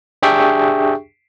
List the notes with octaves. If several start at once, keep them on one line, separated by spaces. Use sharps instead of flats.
D4 G4 G#4 E5 G5 C#6